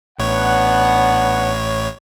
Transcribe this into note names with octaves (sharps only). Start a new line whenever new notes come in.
A1 A2 B3 D4 C#5 F#5